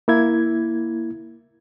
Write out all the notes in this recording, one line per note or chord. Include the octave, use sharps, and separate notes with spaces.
A#3 E4 G#6